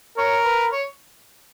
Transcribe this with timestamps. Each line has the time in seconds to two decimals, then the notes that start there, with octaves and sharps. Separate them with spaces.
0.18 A#4 C#5
0.45 B4
0.72 C#5